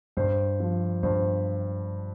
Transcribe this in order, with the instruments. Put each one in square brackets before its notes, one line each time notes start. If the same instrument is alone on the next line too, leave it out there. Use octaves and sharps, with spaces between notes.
[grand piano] G2 C5
F3
G2 C5